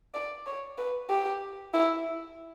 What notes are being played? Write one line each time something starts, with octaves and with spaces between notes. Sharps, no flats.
D5
C#5
B4
G4
E4